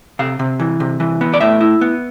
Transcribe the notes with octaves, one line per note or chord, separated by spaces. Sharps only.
C3 F5
C3
E3
C3
E3
B3
D5
A2 E5
E4
B3